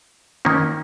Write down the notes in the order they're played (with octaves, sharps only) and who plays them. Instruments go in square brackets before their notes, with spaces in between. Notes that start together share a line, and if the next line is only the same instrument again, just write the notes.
[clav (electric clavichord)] D#3 A#3 C#4